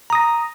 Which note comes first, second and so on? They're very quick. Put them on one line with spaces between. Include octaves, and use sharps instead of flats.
A#5 D#6 A#6